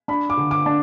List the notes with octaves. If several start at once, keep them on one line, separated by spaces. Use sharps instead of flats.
D4 B5
D6
D3
D6
D4